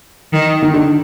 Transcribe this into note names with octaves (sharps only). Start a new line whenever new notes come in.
D#3
D#3
D3